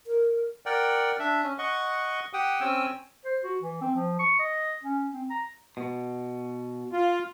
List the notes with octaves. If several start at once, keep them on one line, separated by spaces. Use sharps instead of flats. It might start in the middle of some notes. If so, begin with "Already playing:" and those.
A#4
A#4 D5 F#5 G5
D4 E5
C#4
D#5 F#5 C#6
G4 F#5 G5 D#6
C4 C#4 G5 G#5 E6
C5
F#4
E3
C4
F3
C#6
D#5
C#4
C4
A#5
B2
F4